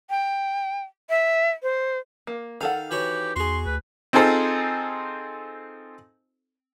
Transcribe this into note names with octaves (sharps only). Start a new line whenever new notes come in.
G5
E5
C5
A#3
D#3 A4 F5 F#5
E3 F#4 G4 C#5
E2 F#4 G#4 C6
D2 B4
C4 D#4 F4 G#4 A4 C5